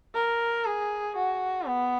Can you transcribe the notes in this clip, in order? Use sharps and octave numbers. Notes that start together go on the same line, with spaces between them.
A#4
G#4
F#4
B3